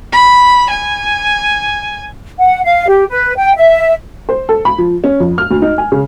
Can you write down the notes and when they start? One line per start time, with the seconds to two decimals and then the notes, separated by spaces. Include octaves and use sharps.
0.13 B5
0.70 G#5
2.38 F#5
2.64 F5
2.88 G4
3.09 B4
3.36 G5
3.56 E5
4.29 C5
4.49 A4
4.65 B5
4.78 F3
5.04 C#4
5.20 F2
5.38 F6
5.51 D2
5.62 D#4
5.78 G#5
5.92 C#3